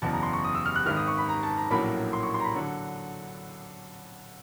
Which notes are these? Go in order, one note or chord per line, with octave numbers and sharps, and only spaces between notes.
F#1 E2 B2 A5
A#5
C6
C#6
D#6
E6
F6
F#6
G#1 G#2 D#3 F6
D#6
C#6
B5
A#5
A5
A#5
A#1 A2 F#3 A#3 C#4 B5
C6
C#6
C6
A#5
B5
D3 F#3